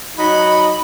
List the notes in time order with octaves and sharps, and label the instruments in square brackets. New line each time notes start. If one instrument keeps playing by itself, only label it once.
[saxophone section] F#3 D#5 [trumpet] D#4 [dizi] B5